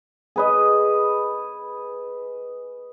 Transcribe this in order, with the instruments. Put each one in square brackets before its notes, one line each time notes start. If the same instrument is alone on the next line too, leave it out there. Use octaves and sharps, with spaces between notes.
[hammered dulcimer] G#4 B4 D#5